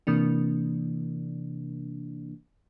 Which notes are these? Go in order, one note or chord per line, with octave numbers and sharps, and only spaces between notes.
C3 E3 A#3 D4